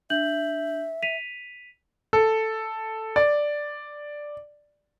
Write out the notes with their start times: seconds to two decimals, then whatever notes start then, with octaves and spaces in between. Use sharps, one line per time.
0.10 D4 E5 G6 F#7
1.03 B6 D#7 F7
2.13 A4
3.16 D5